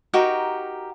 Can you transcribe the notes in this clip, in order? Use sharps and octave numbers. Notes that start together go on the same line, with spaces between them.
D#4 F#4 G4 A#4